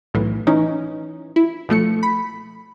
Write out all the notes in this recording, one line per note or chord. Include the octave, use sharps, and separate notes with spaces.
B1 A2 E3
E3 C#4 D#4
E4
B1 F3 A3 C#7
B5